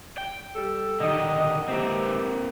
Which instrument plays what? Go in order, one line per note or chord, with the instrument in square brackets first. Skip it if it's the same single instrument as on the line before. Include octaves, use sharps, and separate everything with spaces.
[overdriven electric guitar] G5
[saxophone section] G3 A4
[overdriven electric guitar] D3 D#3 [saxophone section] G4 D#5
[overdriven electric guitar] A#3 C4 [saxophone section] E4 G4